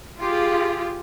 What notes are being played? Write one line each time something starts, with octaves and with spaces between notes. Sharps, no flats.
F4 G4 G#4